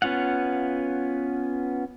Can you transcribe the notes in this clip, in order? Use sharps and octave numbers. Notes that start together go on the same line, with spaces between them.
B3 C#4 F4 F5 F#5